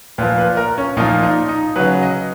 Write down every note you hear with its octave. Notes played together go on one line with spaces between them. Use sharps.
A#2 F3 B4
B4
A#4
C#4
A#2 F3 D#4
D#4
D#4
C#3 F#3 B4
D#5